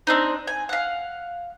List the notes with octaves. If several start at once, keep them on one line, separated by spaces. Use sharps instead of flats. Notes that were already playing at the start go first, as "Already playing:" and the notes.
C4 D4 D#4
G#5
F5 F#5